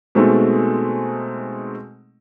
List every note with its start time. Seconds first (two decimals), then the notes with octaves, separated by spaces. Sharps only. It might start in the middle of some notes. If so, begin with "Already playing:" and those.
0.15 B2 G#3 A3 C4 D#4 G#4